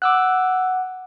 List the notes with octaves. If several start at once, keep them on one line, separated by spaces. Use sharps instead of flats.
F#5 D6 E6 F#6